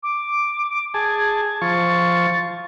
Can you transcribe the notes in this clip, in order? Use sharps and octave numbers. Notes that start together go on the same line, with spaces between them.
D6
G#4 A5 G#6
F3 C#6 A6